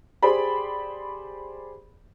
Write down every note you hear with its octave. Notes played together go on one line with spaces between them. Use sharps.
G4 G#4 C5 D5 B5